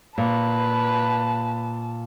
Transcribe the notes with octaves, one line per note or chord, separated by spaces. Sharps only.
A#2 B4 A5